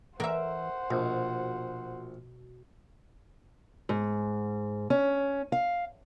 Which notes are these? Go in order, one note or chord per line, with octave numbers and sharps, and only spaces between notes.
E3 A#4 C5 E5 F#5
A#1 B2
G#2
C#4
F5